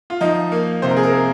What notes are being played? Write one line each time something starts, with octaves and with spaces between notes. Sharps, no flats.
F4
F3 D#4
A#3
C3 C5
A#4
G#4
A#4
A#3